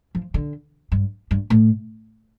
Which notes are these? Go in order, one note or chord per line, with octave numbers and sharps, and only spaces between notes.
F3
D3
G2
G2
A2